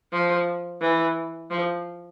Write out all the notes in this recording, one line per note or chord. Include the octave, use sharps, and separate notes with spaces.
F3
E3
F3